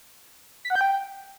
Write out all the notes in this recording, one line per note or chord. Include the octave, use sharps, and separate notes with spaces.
B6
F#5
G6
G5